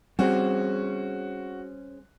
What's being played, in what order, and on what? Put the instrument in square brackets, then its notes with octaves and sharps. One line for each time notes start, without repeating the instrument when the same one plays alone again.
[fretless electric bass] G3 C4 [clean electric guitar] C#4 G#4 C5 [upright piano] F#4